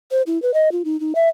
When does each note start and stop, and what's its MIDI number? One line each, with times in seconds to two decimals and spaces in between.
0.11 0.22 72
0.27 0.41 64
0.42 0.54 71
0.54 0.71 75
0.72 0.82 65
0.85 0.99 63
1.00 1.13 63
1.15 1.29 76